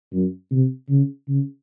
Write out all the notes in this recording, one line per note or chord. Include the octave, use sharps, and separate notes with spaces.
F#2
C3
C#3
C#3